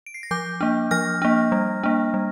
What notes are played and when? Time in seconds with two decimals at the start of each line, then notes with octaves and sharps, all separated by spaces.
0.06 D7
0.14 C7
0.23 A#6
0.31 F3 D6 G6
0.61 A#3 D4
0.91 F3 F6 A#6
1.22 A#3 D4
1.52 G3
1.83 A#3 D4
2.14 G3